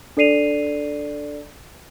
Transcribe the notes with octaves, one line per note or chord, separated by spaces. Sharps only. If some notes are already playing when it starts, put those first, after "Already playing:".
D4 A4 D5 C7 D#7 F7